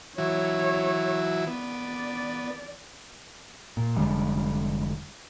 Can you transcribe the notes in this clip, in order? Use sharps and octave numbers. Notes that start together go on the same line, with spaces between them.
E3 F#3 E4 C#5
B3 D5
A#2
F1 D3 G3 G#3